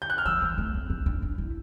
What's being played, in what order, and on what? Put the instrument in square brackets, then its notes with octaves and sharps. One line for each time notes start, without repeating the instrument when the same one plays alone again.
[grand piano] G6
F#6
F6
[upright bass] F3 [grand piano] E6
[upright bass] E3
A3
C4
C#4
D4
D4
E4